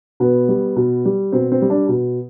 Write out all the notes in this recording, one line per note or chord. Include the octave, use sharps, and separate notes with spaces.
B2 B3
G3
B2
G3
B2 C4
C4
G3
D4
B2